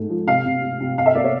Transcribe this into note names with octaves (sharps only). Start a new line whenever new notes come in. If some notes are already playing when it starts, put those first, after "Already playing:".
Already playing: G#2 A3
F3
C3 F5
C3
C3
C3
C3 F5
E5
A#3 D5
C#5